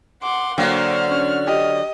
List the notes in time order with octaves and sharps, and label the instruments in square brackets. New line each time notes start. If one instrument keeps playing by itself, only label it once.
[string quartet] F#5 C6 [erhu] D6
[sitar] D3 F#3 [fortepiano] A#3 G5 [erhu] C5 [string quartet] F#5 F6
[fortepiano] C#4
[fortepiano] G4 [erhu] D#5